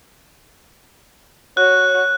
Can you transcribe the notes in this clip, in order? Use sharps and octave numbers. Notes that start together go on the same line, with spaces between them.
F#4 C#5 F#6